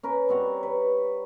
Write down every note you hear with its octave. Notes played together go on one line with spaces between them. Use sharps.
C#4 A#4 B4
G3 C4 C#5 F#5
B4